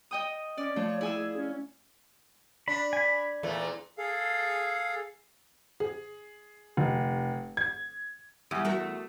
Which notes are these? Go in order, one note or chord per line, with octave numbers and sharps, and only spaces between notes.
D#5 G5 D#6
C#4 D5
F3 A3 C#5
E4 G#4 G#5 E6
C#4
D4 B5
G#5 B5
E2 A#2 A3
G#4 A4 F5
G#4
F1
G#6
E2 G3
A3 F#4 A#4